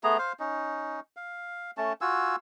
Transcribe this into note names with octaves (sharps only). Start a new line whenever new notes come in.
A3 B3 G#4 A#5
C5 F5
C#4 D#4
F5
A3 C#4 A5
F4 F#4 G#5 E6